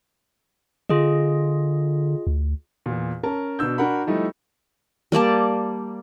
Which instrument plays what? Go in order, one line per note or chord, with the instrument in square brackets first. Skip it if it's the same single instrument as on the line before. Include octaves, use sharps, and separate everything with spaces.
[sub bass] D3 [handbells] F4 G#4 D#5
[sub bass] D2
[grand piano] E2 A#2
C#4 A#4 A5
B2 D4 E6 G6
D4 F#4 A#4 F#5 B5
F3 G3 A3 D#4 E4
[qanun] G3 A#3 D5 A5